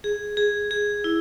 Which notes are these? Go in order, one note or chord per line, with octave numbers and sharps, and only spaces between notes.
G#4
G#4
G#4
E4